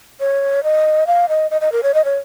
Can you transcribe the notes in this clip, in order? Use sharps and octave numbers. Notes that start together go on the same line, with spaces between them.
C#5
D#5
F5
D#5
D#5
D#5
A#4
C#5
D#5
C#5